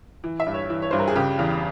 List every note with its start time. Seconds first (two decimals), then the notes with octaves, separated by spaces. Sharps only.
0.24 E3
0.40 E5
0.46 G2
0.54 C#5
0.70 E3
0.82 C#5
0.91 G2 C5
0.99 A#4
1.08 G#4
1.16 C#3 G4
1.39 E2